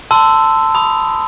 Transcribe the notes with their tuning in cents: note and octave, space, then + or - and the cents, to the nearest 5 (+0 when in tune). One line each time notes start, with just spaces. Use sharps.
A5 +15 C6 -20 E6 +0
B5 +0 D#6 +5